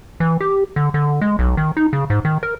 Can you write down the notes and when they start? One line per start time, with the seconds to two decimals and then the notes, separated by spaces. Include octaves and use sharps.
0.20 E3
0.41 G4
0.76 D3
0.94 D3
1.21 G#3
1.39 B1
1.57 D#3
1.77 D#4
1.93 C#3
2.10 G#2
2.25 D#3
2.43 A#4